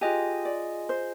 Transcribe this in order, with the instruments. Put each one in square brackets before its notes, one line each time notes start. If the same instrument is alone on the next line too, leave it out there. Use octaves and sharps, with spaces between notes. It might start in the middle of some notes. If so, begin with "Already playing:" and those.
[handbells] F4 G#4 D#5 G#5 [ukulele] G4
[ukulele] D5
C5